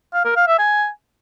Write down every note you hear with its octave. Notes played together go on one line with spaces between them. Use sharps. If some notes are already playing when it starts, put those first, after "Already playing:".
F5
A#4
F5
E5
G#5